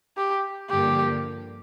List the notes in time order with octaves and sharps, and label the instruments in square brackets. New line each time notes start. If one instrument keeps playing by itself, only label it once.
[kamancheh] G4
[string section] G2 D3 F3 A#3 [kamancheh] G4